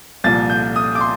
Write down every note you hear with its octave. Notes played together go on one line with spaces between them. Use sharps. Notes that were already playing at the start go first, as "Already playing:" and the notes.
C2 A#2 F3 A6
G6
D#6
D6
C6